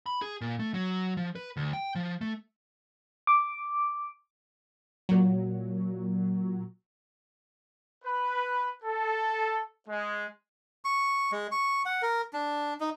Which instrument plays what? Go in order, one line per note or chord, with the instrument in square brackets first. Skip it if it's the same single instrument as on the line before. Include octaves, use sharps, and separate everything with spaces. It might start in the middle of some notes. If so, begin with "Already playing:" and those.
[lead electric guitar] B5
G#4
A#2
A3
F#3
F3
B4
D2
G5
F3
A3
[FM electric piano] D6
[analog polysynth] A#2 F#3
[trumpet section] B4
A4
G#3
[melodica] C#6
G#3
C#6
F#5
A#4
D4
D#4